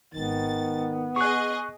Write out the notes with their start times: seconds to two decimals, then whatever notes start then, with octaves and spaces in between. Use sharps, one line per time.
0.14 G#1 D#3 B3 A6
1.16 G#4 D#5 C#6 F#6